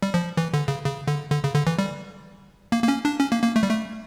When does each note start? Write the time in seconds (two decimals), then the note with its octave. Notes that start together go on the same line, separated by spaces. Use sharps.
0.02 G3
0.14 F3
0.37 E3
0.54 D3
0.68 C#3
0.85 C#3
1.08 D3
1.31 D3
1.44 C#3
1.55 D3
1.67 E3
1.79 G3
2.72 A#3
2.83 A#3
2.88 C#4
3.05 D4
3.20 C#4
3.32 A#3
3.43 A#3
3.56 A3
3.63 G3
3.70 A3